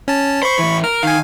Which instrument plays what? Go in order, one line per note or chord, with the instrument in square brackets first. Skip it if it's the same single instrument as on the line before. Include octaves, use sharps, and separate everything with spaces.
[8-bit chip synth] C#4 A5
[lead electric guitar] C5 [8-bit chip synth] B5 C#6
[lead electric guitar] A2 E3
[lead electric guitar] A#4 [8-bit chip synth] F6
[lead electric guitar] D#3 [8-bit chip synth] F5 G#5